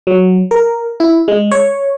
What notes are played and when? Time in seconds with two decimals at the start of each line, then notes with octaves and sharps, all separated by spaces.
0.07 F#3
0.51 A#4
1.00 E4
1.28 G#3
1.51 C#5